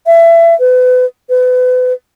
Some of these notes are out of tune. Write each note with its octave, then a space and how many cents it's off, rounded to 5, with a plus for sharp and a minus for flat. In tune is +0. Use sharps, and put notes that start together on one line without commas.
E5 +25
B4 +35
B4 +35